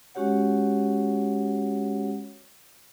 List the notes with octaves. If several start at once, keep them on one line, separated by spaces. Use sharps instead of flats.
G#3 C#4 F#4 G4 C#5 F#5